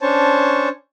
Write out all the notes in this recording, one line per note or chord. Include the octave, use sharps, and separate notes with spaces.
C#4 D4 C5 C#5 A5